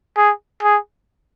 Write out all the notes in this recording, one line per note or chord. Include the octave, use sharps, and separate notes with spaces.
G#4
G#4